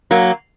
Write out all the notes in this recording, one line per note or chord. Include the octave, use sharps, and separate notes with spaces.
F#3 A#3